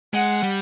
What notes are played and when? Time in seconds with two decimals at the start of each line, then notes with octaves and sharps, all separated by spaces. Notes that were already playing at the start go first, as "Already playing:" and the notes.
0.14 G#3 F#5
0.43 G3